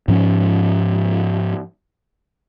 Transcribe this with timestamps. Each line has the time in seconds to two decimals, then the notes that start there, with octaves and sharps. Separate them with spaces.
0.08 G#2 F3 C#4